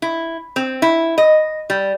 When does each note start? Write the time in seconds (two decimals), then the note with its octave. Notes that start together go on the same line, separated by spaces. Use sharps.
0.02 E4
0.56 C4
0.82 E4
1.18 D#5
1.70 G3